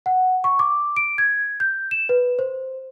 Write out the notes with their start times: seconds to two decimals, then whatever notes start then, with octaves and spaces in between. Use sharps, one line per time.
0.06 F#5
0.44 C#6
0.59 D6
0.96 D7
1.18 G#6
1.60 G6
1.91 E7
2.09 B4
2.39 C5